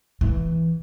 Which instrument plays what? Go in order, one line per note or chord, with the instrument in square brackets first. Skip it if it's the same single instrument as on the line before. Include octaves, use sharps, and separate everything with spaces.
[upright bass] E3